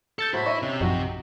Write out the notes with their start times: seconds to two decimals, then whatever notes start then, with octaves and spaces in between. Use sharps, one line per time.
0.19 A4 G6 A6 C#7
0.33 A2 E4 F#4 C5 B5
0.46 D#5 E5 C#6
0.62 C3 C#4
0.80 A#1 F#2 F3 D#4 F#4